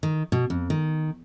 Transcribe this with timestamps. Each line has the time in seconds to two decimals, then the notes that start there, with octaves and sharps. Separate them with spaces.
0.03 D#3
0.32 B2
0.50 F2
0.70 D#3